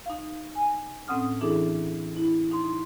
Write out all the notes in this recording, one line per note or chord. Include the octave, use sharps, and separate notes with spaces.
D#4 F5
G#5
A2 C4 C#4 F#5 D#6 F6
E3 D4 E4 G#4 A4
E4
D#4 C6